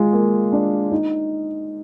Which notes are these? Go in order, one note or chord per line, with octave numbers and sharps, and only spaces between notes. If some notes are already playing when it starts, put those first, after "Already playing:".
Already playing: G#3 F4
A#3
D4
D#4